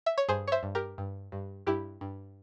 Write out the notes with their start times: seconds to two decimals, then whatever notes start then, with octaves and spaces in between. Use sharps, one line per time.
0.06 E5
0.18 C#5
0.29 G2 G#4 C5
0.48 C#5
0.52 C5 E5
0.63 G2
0.75 G4 A#4
0.98 G2
1.32 G2
1.67 G2 E4 G4
2.01 G2